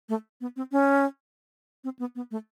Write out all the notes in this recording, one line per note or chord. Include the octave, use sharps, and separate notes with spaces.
A3
B3
C4
C#4
C4
B3
B3
A3